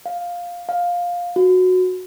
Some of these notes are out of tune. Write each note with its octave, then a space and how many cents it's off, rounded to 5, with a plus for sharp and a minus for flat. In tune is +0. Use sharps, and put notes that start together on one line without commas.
F5 +5
F5 +10
F#4 -10